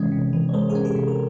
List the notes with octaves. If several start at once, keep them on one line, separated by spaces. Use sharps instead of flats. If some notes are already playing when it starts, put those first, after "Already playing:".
Already playing: C3 E3 G#3 C#4 C#5
C3
E3
C#5
G#3 A#4 C5
G#4 A#4
C#4
G4 A4
C3
A#4